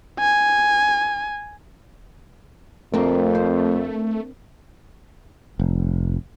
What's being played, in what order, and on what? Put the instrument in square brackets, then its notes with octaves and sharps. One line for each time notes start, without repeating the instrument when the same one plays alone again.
[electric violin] G#5
[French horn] F2 [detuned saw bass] A3 [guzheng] A#3 C4 D4
[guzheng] C5
[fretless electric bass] F1